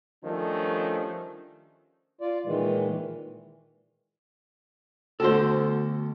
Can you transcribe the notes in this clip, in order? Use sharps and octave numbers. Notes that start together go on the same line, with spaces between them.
D#3 F3 G3 A3 C#4 D4
F4 D5
A#2 D#3 E3 G#3
D2 B2 D3 A4 C5